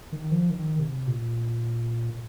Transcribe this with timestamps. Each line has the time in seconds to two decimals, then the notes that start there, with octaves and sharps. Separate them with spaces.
0.12 D#3
0.32 F3
0.50 D#3
0.79 C3
1.07 A#2